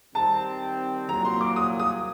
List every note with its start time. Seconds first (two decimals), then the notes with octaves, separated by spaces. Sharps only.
0.15 D#3 G3 C4 A5
1.09 C2 A#2 F#3 A#3 A#5
1.25 C6
1.41 D6
1.56 D#6
1.80 D#6